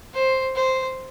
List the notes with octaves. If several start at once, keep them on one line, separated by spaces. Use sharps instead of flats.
C5
C5